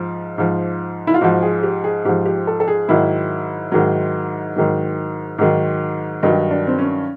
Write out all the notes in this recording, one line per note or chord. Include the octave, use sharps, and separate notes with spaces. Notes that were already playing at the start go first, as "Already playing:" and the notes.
Already playing: G#2 F3
G#2 F3
E4
F4
G#2 F3 F#4
G#4
G4
G#4
G#2 F3 G4
G4
A4
A4
G#4
G#2 D#3 F#3 E4
G#2 D#3 F#3
G#2 D#3 F#3
G#2 D#3 F#3
G2 D#3 F#3 D#4
D4
C4
C#4